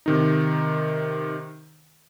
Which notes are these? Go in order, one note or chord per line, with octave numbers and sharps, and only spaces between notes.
C3 D#3 D#4